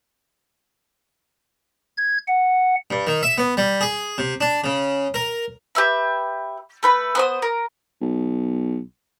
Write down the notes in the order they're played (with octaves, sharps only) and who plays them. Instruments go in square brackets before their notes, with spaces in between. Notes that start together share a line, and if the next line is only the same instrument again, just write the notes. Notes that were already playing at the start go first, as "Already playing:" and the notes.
[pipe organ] G#6
F#5
[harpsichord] G2
D#3
E5
B3
G3
G#4
C3
D4
C#3
A#4
[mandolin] G4 B4 E5 B5
A3 B4 B5
B3 C5 D#6
A#4
[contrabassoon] B1